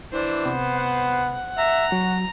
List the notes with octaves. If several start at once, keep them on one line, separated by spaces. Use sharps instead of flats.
E3 D4 C5
C3 B3
F#5
E5 A#5
F#3 F#4